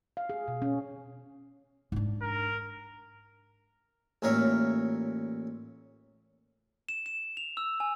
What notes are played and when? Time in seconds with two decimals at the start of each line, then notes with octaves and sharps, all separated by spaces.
0.17 F5
0.29 G#4
0.48 B2
0.62 C#4
1.92 G#2 D4
2.21 A#4
4.22 A1 A#2 A#4 C#5 E5 F5
6.89 E7
7.06 E7
7.37 F7
7.57 E6
7.80 G#5